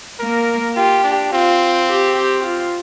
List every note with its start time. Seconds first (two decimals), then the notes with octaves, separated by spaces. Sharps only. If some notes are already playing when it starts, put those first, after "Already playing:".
0.19 A#3 A#4
0.76 F4 G4
1.04 D4
1.32 C4 F4
1.88 G4
2.16 G4
2.44 F4